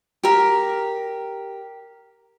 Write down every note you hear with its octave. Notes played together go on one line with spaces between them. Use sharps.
G4 A#4